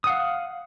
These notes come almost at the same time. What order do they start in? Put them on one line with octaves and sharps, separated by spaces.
D#6 F#5 F5